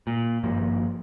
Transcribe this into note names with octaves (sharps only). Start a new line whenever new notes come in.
A#2
G#1 G2 F3 A#3